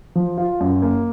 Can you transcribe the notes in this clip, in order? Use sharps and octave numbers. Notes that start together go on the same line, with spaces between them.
F3
F4
F#2
A#3